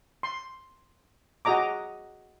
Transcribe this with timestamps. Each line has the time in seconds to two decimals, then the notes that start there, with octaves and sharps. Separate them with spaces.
0.23 C6
1.45 F#4 G#4 D#5 A#5 D6